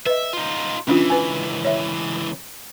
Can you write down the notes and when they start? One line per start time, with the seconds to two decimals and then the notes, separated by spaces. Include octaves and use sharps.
0.06 B4 D#5 E5
0.33 D#4 F4
0.88 C#2 E3 C#4 D4 F4
1.10 B4 G#5
1.65 C#5 E5